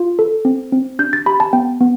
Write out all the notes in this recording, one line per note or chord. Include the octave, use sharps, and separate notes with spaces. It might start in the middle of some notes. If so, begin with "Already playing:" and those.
Already playing: F4
A4
C4
C4
D4 G6
A6
G4 B5
A5
B3 G5
B3